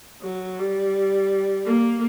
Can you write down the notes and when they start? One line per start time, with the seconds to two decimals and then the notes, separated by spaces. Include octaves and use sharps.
0.22 F#3
0.59 G3
1.66 A#3